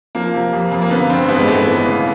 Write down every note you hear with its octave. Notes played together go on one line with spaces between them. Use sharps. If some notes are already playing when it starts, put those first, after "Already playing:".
F3 A#3
C3
F2
F2
A#3
D3 B3
G2 C4
A1 B3
G#3
A1 A3
E3 B3
C#3